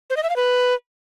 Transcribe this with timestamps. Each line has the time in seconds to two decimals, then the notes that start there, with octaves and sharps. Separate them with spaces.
0.10 C5
0.17 D#5
0.23 E5
0.30 F5
0.36 B4